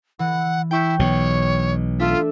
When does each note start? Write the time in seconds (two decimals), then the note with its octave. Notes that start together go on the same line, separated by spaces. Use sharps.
0.19 E3 F#5
0.71 E4 G5 C#6 G6
0.99 B1 B2 C#5
1.99 A3 D4 F4 E5